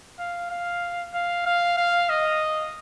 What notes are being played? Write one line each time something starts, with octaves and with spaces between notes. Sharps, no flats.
F5
F5
F5
F5
F5
D#5